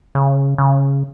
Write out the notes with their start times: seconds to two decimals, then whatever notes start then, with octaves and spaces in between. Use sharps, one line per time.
0.15 C#3
0.58 C#3